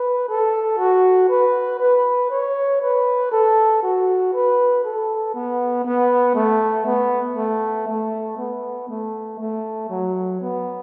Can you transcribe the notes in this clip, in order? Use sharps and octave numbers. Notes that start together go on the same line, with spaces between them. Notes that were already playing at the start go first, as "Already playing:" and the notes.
Already playing: B4
A4
F#4
B4
B4
C#5
B4
A4
F#4
B4
A4
B3
B3
A3
B3
A3
A3
B3
A3
A3
F#3
B3